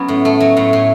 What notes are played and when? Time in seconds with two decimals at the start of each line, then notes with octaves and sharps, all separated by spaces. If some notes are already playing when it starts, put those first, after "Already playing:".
Already playing: F#3 B3 C#4
0.08 A2
0.25 A3
0.40 F#3
0.57 A2
0.73 A2